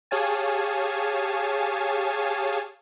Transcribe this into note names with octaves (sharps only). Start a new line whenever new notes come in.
G4 G#4 C#5 F5 G#5 A5